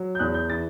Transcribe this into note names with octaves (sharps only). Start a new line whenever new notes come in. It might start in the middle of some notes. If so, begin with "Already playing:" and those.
Already playing: F#3
G6
E2 F#6
G6
E3 A6